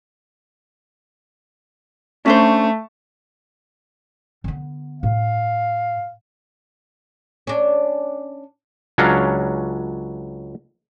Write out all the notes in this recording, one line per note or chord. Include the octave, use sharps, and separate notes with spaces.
A3 C#4 D4 C5
D3 B3
A2 F5
C#4 D4
C#2 F#3 C#4 D4 F5 A#5